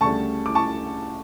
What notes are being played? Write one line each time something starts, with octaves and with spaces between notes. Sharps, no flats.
D2 C#3 G3 A5 C#6
D6
A5 C#6